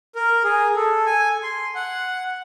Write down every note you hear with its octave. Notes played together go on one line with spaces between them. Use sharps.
A#4
G#4
A4
G#5
C6
F#5